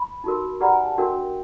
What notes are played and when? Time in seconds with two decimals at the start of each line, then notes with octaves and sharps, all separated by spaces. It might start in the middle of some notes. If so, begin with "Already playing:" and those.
Already playing: B5
0.24 D#4 F#4 A#4
0.60 G4 B4 D5 F#5 A#5 B5
0.73 G#5
0.86 A5
0.97 D4 F#4 A#4 G5